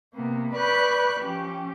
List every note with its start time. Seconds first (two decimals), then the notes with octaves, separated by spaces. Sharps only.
0.15 C3 A#3 B3
0.54 B4 D5 B5 C#6 F#6 G6
1.20 F3 C#4 G4